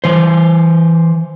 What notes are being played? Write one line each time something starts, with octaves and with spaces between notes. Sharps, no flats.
E3 C5